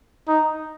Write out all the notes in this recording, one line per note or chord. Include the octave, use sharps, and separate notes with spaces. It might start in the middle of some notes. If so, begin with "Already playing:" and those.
D#4